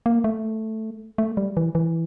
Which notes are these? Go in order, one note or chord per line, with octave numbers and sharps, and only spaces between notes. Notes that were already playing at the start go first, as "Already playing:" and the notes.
A#3
A3
A3
G3
E3
E3